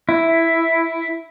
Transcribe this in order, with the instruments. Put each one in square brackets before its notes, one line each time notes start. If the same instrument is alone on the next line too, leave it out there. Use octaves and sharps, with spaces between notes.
[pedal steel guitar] E4